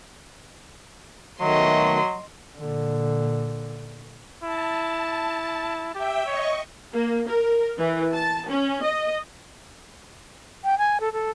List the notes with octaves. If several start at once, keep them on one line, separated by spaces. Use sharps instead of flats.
B2 D#3 F#3 A3 D#5 C6
A#2 D3
E4 A5
G4 E5 G5
C#5 D#5 C#6
A#3
A#4
E3
A5
C#4
D#5
G5
G#5
A4
A4